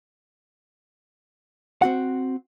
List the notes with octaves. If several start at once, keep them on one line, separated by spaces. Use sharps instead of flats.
C4 F#4 F#5